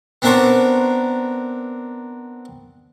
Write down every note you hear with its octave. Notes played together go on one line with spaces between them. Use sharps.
B3 C4 D4 A#4 C5 C#5